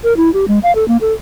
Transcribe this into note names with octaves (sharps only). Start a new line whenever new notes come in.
A#4
E4
G4
G#3
F5
A4
A#3
A4